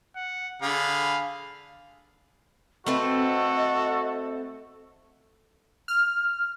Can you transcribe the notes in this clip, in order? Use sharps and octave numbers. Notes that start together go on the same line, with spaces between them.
F#5
D3 G#4 F5 B5
A3 C4 F#4 A4 B4 D#5
F6